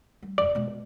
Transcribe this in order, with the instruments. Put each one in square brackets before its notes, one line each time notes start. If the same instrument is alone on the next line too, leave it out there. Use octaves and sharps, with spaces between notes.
[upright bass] G3
[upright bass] E1 F#2 [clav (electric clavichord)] D5
[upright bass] B2 G#3